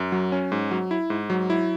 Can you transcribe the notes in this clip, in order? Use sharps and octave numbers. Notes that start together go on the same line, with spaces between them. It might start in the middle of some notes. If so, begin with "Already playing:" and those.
Already playing: F#2
F#3
C#4
G#2
F#3
E4
G#2
F#3
E4